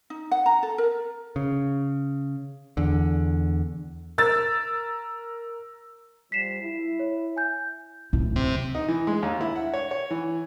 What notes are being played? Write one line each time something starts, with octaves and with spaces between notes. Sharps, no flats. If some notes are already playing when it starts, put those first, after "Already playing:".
D#4
F#5
A#5
A4
A#4
C#3
E2 D3
A#4 E6 A6
F3 G3 B6 C7 E7
E4
C#5
G#5 G6
D1 E4
C3
D#4
E3
G#3
D#2
E4
F#5
C#5
C#5
E3